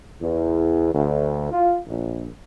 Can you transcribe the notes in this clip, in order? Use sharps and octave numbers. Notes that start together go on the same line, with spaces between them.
E2
D2
F4
A#1